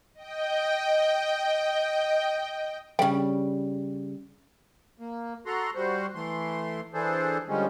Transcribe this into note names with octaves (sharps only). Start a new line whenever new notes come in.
D#5 G5
C#3 G3 G5
A#3
F#4 A4 A#5 C6
G3 F#4 C5
E3 A3 C6
E3 D4 G#4 A4 C5
D3 F3 G3 G#3 C#4